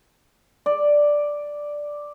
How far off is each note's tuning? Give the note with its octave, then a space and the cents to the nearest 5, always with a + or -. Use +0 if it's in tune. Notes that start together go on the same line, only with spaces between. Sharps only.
D5 +0